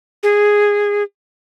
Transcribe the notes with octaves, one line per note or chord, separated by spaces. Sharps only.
G#4